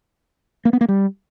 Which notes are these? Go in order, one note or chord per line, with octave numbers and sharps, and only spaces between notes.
A#3
B3
A#3
G3